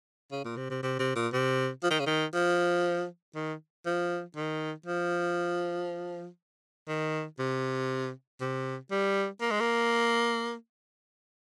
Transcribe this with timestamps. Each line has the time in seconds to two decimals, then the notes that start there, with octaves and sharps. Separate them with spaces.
0.31 C#3
0.45 A#2
0.57 C3
0.70 C3
0.83 C3
0.99 C3
1.16 A#2
1.33 C3
1.84 F3
1.91 D#3
1.99 C#3
2.06 D#3
2.34 F3
3.35 D#3
3.86 F3
4.36 D#3
4.86 F3
6.88 D#3
7.39 C3
8.41 C3
8.91 G3
9.41 A#3
9.51 G#3
9.60 A#3